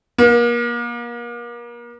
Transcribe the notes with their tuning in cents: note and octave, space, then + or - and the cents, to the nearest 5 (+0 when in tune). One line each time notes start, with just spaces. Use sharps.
A#3 +35